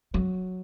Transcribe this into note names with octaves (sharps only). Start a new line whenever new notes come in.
F#3